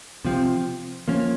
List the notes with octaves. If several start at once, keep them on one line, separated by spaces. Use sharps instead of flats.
C3 F3 C4
F3 A#3 C#4